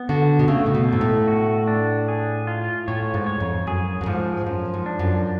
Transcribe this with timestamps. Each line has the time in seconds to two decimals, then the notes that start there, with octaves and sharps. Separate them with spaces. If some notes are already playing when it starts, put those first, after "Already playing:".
Already playing: B3
0.09 D3 F#4
0.39 B2
0.48 C#3 A3
0.66 A2
0.75 B2
0.89 G#2 A3
1.01 A2
1.28 F#4
1.68 D4
2.08 G#4
2.47 F4
2.88 A2 C#5
3.14 G#2
3.27 C#5
3.40 F2
3.67 F#2 G#4
4.01 F#2
4.06 G#2 F3
4.46 F#2 F3
4.74 G#2
4.86 D4
4.99 F#2